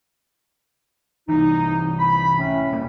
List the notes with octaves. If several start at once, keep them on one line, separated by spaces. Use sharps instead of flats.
C2 E3 D#4
B5
A2 A3 C#4
F1 B2 A#3